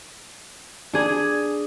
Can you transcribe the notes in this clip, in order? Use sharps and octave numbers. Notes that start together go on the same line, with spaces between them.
D4 G#4